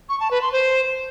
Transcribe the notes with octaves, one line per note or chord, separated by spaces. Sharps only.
C#6
A5
B4
C6
C5